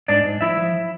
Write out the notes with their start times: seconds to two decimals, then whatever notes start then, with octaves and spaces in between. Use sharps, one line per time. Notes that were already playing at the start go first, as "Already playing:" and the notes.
0.08 G#2 D4 D5
0.24 G#2
0.41 F3 E4 E5
0.57 F3